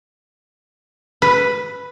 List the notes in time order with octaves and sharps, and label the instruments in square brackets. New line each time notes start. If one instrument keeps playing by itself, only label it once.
[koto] B4